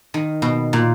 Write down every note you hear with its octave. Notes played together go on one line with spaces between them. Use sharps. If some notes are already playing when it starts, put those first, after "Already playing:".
D#3
B2
A#2